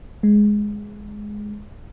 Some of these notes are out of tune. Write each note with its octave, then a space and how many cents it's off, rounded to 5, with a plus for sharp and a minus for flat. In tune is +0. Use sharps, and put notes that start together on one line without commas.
G#3 +5